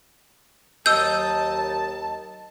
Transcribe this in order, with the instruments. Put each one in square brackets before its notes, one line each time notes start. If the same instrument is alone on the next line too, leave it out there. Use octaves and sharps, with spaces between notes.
[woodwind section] D#2 F#3 [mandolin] D#5 [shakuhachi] A5 [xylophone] E6 G6